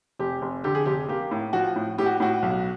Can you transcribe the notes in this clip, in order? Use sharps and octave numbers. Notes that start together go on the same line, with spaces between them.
F1 G4
F1
D3 G4
G#4
F1 G4
A#3 G4
A2
F3 F#4
A2
A2 G4
F#4
A2 F#4
B1